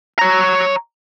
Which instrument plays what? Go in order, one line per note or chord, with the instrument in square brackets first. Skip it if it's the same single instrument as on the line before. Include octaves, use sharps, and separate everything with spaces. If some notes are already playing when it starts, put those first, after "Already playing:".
[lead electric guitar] C#5 A#5